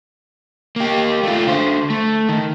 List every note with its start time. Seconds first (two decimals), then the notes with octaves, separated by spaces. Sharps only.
0.76 A#3 G4
1.23 A3 F4
1.47 D3 C5
1.90 A3
2.29 D#3